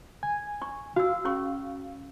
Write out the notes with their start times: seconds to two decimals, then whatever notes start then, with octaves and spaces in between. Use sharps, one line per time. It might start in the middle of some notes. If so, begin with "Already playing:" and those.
0.23 G#5
0.62 C#6
0.96 F#4 F5 E6
1.25 C#4 G#4 C#6